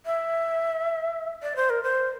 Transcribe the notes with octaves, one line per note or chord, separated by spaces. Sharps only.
E5
D5
C5
A#4
C5